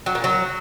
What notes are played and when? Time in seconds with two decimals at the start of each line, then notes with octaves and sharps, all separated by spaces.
0.06 F#3
0.15 A#2
0.24 F#3